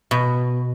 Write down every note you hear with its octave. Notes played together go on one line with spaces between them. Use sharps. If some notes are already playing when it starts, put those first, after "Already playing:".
B2